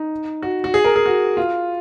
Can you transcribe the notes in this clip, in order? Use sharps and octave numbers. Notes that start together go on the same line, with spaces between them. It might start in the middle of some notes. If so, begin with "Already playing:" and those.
Already playing: D#4
F#4
F#4
G#4
A#4
G#4
F#4
F4